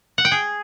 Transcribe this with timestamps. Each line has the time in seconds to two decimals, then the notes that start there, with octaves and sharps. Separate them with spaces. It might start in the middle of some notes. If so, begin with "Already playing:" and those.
0.18 F#5
0.25 G5
0.32 G#4